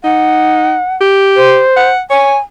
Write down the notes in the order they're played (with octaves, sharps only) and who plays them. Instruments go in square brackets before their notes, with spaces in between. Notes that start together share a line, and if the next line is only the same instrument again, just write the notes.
[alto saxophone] D#4 [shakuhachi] F#5
[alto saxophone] G4
[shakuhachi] C5
[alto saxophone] F#5
[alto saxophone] C#5 [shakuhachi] G#5